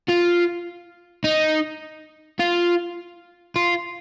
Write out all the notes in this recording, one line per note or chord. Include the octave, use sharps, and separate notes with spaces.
F4
D#4
F4
F4